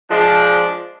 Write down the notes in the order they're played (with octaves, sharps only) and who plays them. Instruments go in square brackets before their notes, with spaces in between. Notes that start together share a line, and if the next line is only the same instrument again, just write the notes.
[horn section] F3 G#3 D4